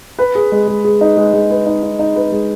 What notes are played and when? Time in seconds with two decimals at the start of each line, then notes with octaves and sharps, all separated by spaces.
0.19 B4
0.35 G#4
0.52 G#3
0.68 G#3
0.84 G#4
1.01 D#4
1.17 G#3
1.34 G#3
1.50 B4
1.66 D#4
1.83 D#4
1.99 D#4
2.16 B4
2.32 G#3